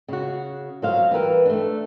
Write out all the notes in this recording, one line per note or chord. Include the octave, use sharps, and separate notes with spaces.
C#3 F#4
F#3 C5 F5
E3 G3 A#4 B4
A3 D4